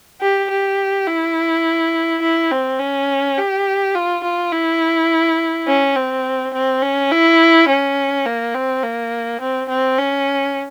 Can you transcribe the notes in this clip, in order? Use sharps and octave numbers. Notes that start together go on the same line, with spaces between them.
G4
G4
E4
E4
C4
C#4
G4
F4
F4
E4
C#4
C4
C4
C#4
E4
C#4
A#3
C4
A#3
C4
C4
C#4